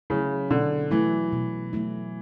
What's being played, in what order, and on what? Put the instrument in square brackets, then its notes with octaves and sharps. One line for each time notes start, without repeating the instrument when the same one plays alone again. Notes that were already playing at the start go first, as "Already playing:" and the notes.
[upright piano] C#3 [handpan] F#3 A3 E4
[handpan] B2 [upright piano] D3
[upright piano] E3 [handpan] F#3 A3 E4
[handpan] B2
F#3 A3 E4